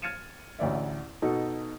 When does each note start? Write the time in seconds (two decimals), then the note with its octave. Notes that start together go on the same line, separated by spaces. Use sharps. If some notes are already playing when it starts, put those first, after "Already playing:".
0.02 F6 G#6 A6 C#7 D#7 E7
0.59 A1 D2 D5 E5
1.22 B2 D#4 F#4 A4